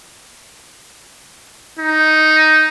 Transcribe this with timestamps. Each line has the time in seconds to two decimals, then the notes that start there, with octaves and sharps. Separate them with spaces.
1.79 D#4